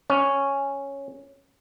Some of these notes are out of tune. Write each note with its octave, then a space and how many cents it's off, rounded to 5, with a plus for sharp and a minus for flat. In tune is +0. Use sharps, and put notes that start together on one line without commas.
C#4 +0